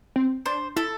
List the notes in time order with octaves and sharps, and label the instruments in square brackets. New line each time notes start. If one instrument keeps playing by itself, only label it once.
[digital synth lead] C4
[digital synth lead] D4 [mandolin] C5
[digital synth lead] E4 [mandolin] A4